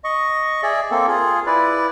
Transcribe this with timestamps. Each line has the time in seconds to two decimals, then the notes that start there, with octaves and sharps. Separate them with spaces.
0.04 D#5 C#6
0.63 G#4 D5 E5
0.91 A#3 C4 A4
1.08 F4 G#4
1.47 E4 B4 D5